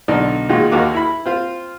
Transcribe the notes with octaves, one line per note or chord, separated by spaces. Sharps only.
B1 D3 D#4 D5
A#2 D#3 G#3 D#4 F4 F#4
D#2 D#3 A#3 F#4 F5 D6
E4 B5
C4 F4